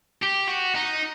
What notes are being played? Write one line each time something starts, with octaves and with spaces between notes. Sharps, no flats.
G4
F#4
D#4